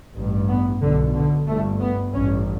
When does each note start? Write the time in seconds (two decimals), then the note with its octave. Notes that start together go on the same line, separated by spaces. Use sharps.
0.15 A1 G2
0.48 B3
0.81 B1 B2 D3
1.14 D3
1.47 G1 G2 A3
1.81 B3
2.13 A1 G2 C#4